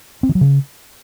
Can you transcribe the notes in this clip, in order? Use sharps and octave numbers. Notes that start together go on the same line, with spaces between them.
C4
D#3
F#3
C#3